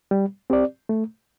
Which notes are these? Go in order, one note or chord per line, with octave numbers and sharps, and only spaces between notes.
G3
C4 G4 D5
A3